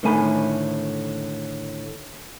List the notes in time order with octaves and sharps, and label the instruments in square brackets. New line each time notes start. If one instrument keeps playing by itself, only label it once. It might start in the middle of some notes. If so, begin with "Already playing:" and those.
[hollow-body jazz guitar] A2 D3 D#3 A3 G#5 B5